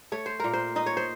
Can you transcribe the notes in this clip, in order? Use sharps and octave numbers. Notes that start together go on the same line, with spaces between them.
A3 C#5
C5
A#2 A#4
C5
D#4 D#5
C#5
C5